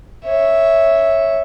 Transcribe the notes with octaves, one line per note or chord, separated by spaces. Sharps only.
C#5 E5